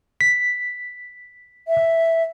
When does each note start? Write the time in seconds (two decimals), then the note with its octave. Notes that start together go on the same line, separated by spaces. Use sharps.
0.21 B6
1.68 E5